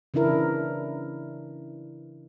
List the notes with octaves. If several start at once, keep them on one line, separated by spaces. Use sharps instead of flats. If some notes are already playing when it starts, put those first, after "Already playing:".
C#3 E3 D4 E4 A#4